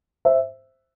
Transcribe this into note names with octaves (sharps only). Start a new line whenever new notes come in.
C5 E5